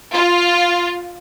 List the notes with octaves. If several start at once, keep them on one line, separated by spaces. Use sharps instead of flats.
F4